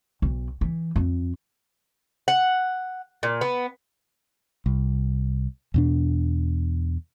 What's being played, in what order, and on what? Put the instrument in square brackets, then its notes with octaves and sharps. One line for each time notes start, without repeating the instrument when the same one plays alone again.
[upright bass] B1
E3
F2
[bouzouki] F#5
A#2
B3
[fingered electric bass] C2
E2 B2 D4